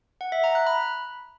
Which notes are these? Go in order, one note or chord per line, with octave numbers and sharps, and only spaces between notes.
F#5
E5
A#5
F#6
B5